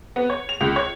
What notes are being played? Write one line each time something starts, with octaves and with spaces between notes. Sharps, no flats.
B3
C#5
F7
C#2
C#5